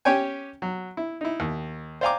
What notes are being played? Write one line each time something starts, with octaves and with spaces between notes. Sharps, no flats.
C#4 G4 C#5 G5 G#5
F#3
E4
D#4 E4
D#2
C5 D5 F5 G#5 A#5 D6